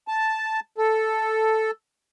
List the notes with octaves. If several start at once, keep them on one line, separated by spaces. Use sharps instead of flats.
A5
A4